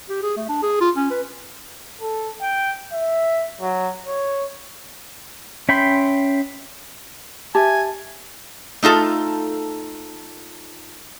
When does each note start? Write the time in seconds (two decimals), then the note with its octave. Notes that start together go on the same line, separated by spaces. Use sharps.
0.09 G4
0.23 G#4
0.37 A3
0.49 D4
0.63 G#4
0.81 F4
0.96 C#4
1.11 B4
2.01 A4
2.41 G5
2.93 E5
3.61 F#3
4.06 C#5
5.69 C#4 E5 G5 B5 C6
7.55 G4 E5 G#5 A5
8.83 A3 D#4 F4 A4